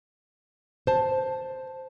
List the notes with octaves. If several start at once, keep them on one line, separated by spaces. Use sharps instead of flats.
C5 A5